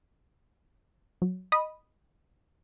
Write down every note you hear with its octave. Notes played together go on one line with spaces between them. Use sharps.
F#3
D#5 B5 D#6